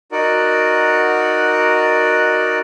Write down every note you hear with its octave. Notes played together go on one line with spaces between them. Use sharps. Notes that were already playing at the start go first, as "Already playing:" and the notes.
D#4 F#4 A#4 D5 F#5